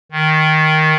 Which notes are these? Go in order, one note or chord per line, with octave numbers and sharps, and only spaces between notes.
D#3